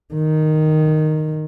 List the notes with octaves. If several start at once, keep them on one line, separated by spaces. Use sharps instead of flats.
D#3